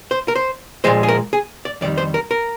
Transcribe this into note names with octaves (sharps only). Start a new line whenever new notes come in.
C5
A#4
C5
A#2 F3 G#3 C5
G#4
A#4
G#4
D5
F2 D#3 G3 D5
C5
A#4
A#4